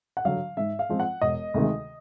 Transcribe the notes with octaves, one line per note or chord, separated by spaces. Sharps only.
F#5
D3 F#3 F5
G#2 E5
F5
F3 G#3 C4 F4
F#5
E1 D#5
D2 C3 D#3 G#3